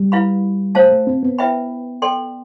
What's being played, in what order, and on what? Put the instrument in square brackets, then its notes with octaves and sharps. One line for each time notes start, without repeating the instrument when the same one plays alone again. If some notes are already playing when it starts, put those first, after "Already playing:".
Already playing: [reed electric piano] G3
[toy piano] E4 B4 F5 B5
[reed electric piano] A3 [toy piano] F4 C5 F5 A5
[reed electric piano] A3
C4
B3
[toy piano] E4 B4 E5 G5 B5
A4 D5 G5 C6